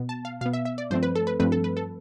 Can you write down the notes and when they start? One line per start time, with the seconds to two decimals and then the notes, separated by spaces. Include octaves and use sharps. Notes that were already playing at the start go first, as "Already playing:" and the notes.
Already playing: B2 B3
0.09 A5
0.25 F5
0.41 B2 B3 F5
0.53 E5
0.65 E5
0.78 D5
0.90 G2 F3 A3 C4 C5
1.03 B4
1.15 A4
1.27 B4
1.40 G2 F3 A3 C4 B4
1.52 A4
1.64 B4
1.77 A4